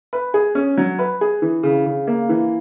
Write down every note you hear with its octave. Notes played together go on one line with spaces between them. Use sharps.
B4
G#4
C#4
F#3
B4
G#4
E3
C#3
C#3
A#3
E3